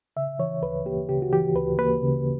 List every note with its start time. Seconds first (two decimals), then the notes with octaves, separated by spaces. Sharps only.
0.16 C#3 E5
0.39 E3 C#5
0.62 D2 B4
0.85 A#3 G4
1.09 C#3 G4
1.22 F#4
1.33 E3 G4
1.55 D2 B4
1.78 A#3 B4
2.02 C#3